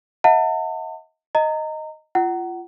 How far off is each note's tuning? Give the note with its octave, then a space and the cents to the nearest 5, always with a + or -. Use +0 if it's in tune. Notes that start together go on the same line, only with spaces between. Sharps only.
D#5 +45 F#5 -45 A5 +40
D#5 +0 A#5 -25
F4 -20 F#5 +25